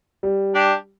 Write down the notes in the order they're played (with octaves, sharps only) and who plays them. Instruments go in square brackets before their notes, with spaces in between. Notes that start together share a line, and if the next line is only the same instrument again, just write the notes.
[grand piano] G3
[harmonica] D4 G4